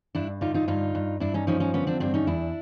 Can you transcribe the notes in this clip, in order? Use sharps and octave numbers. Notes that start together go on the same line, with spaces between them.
G2 D4 E4
D3 D#4 F4
D#4 F4
G2 D#4 F4
G2
G2 D4 E4
C#4 D#4
F3 C#4 D#4
C#4 D#4
D3 B3 C#4
C4 D4
G2 C4 D4
C#4 D#4
E2 D4 E4